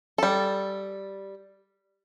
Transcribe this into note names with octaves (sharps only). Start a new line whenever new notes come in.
G3 A4